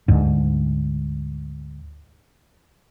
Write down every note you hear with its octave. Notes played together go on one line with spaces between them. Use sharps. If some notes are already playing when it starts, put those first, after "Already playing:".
D2 G#2